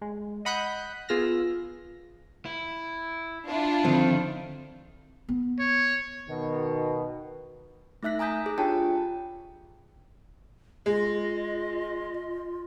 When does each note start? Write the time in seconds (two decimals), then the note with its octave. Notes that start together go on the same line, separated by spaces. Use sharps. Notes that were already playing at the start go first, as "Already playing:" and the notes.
0.02 G#3
0.45 D#5 F#5 B5 D#6 F#6 G6
1.09 B3 F4 G#4 E6 F6 A#6
2.45 E4
3.46 D4 E4 F4
3.85 D3 D#3 F3 C4
5.29 B3
5.60 C#5
6.29 B2 D#3
8.03 A3 D#4 E5 F#6 B6
8.19 G#5 A#5 D#6 G6 B6
8.46 G#4
8.58 D4 F4 G4 C#5 G5 A5
10.86 G#3 F4 D#5